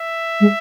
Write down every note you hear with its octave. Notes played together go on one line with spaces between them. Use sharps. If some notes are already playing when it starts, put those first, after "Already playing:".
Already playing: E5
G#3